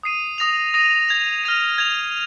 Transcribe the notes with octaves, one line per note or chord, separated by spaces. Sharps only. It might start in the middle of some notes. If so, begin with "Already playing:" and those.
D#6 C7 D#7
D#6 A#6 F7
D#6 A#6 D#7
G#6 F7
F6 A#6 D#7
G#6 F7